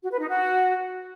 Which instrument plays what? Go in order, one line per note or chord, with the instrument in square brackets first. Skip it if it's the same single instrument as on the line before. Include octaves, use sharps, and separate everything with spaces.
[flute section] F#4
B4
D#4
F#4